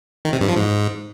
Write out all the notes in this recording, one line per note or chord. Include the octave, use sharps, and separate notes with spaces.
D#3
C3
G2
F3
G#2